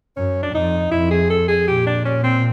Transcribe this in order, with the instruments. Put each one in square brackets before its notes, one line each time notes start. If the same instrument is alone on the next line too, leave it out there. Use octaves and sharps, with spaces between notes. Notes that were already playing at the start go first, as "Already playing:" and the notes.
[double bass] F#2 [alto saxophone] C#4
[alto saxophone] D4
[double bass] F2 [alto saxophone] D#4
[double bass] F2 [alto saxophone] E4
[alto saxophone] G#4
A4
G#4
[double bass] A#2 [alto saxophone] G4
[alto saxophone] D4
C#4
C4